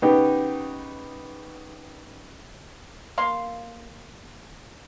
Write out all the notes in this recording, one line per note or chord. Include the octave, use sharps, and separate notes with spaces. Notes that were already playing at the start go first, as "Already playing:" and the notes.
C#3 B3 D#4 G4
A#3 F5 C6